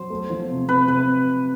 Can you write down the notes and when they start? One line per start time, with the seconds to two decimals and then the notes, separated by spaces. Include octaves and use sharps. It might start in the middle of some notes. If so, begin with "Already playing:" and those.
Already playing: F#3 C5
0.10 A3
0.30 F3
0.49 C3
0.69 C3 B4
0.88 C3 B4